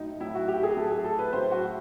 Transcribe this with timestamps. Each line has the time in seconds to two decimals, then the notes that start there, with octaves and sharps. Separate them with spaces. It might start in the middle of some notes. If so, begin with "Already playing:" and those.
Already playing: A2 F#3 D#4
0.20 A2 F#3 E4
0.35 F#4
0.48 G4
0.63 G#4
0.77 A2 F#3 A4
0.91 G#4
1.04 A4
1.19 B4
1.33 A2 F#3 C5
1.51 F#4